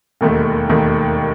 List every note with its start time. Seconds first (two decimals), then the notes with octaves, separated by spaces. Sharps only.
0.21 E1 D#2 D#3 A3
0.69 E1 D#2 D#3 A3